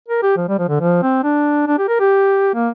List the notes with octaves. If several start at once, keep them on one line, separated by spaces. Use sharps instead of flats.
A#4
G4
F3
G3
F3
D3
F3
C4
D4
D4
G4
A#4
G4
A#3